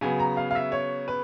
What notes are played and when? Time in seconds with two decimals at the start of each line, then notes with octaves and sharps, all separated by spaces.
0.01 C#3 F#3 B3 G#5
0.19 A#5
0.37 F5
0.51 F5
0.55 E5
0.72 C#5
1.08 B4